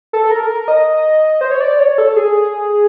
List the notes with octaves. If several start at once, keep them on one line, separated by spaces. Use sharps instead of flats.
A4
A4
A#4
A#4
D#5
C5
C#5
D5
C#5
A4
G#4